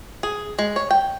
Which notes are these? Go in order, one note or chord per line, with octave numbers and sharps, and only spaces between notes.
G#4
G#3
C#5
G5